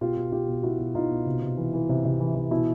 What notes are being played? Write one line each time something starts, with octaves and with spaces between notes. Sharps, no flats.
B2 F4 G4
B2
B2 F4 G4
B2
B2 E4 F#4
B2
B2 D#4 F4
B2
C3
C3
E3
E3
C3
C3
E3
E3
B2 E4